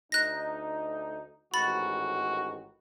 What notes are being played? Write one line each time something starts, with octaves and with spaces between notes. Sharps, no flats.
D2 D#4 F#6 A#6
A1 G#2 D#3 F#4 B5 A6